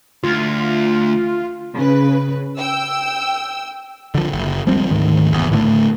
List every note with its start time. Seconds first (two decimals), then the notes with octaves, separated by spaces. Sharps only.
0.23 D2 F4
1.75 C#3 B4
2.59 G5 E6
4.15 D3 F3
4.32 F#1
4.67 F3 G3 G#3 C4
4.90 D2 G#2 D#3
5.32 F#1 E2
5.51 A2 D3 A3